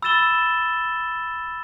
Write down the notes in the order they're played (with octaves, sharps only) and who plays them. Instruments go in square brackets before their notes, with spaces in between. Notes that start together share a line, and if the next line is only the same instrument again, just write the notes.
[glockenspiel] B5 E6 A6 E7 G7